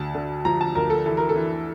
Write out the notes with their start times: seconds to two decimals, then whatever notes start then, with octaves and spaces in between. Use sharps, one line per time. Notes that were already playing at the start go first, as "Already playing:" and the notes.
Already playing: D2 A5
0.15 D3
0.45 F3 A#5
0.61 A5
0.75 D2 A#4
0.90 A4
1.06 E3 A4
1.17 A#4
1.29 A4
1.36 E3